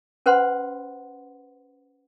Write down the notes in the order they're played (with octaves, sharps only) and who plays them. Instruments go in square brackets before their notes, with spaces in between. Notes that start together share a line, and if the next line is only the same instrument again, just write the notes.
[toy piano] C#4 B4 C5 F#5 B5 C6